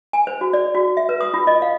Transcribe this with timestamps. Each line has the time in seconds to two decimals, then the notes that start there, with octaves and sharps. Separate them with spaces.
0.13 G#5
0.27 C5
0.41 F#4
0.53 D5
0.75 F#4
0.97 E5
1.09 B4
1.21 D#6
1.34 F4
1.47 D#5
1.62 F5